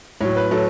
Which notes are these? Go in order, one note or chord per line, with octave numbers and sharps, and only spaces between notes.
A2 F#3 C#5
B4
A2 F#3 A4